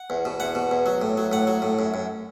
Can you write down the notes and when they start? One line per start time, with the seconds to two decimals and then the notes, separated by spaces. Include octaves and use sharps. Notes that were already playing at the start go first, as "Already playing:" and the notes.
Already playing: F#5
0.10 E2
0.25 B2
0.40 E2 F#5
0.55 B2
0.71 E2
0.86 F#3
1.02 A2
1.17 F#3
1.32 A2 F#5
1.47 F#3
1.62 A2
1.79 F#2
1.94 F#2